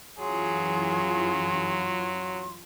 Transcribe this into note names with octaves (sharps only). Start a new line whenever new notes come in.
F#2 E3 F#3 F4 G#4 C6